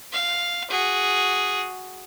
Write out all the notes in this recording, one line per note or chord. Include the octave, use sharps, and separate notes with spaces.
F5
F#4 G#4